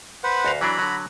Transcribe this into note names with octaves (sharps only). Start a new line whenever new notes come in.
B4 C5 F#5
D2 F#4 F5
E3 F#3 D4 A#5 B5
D3 F#3